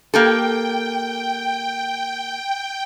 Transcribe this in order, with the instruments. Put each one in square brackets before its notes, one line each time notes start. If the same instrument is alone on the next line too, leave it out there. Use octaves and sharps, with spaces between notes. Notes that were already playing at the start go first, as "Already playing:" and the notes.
[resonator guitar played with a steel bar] A#3 G4 A4 [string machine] G5